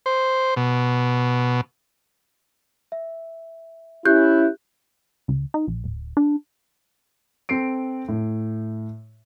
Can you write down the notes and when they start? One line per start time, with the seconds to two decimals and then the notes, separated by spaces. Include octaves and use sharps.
0.06 C5
0.57 B2
2.92 E5
4.05 C#4 E4 G4 F#6 G6
5.28 C#2
5.54 D#4
5.67 A#1
5.84 D1
6.17 D4
7.49 C4 A4 C7 D7
8.08 A2